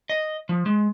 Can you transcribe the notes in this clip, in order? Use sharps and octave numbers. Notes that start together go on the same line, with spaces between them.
D#5
F3
G#3